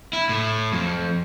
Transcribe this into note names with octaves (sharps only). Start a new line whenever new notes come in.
E4
A2
F2